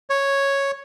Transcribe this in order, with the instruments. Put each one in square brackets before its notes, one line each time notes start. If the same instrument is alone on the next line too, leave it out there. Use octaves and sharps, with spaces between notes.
[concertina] C#5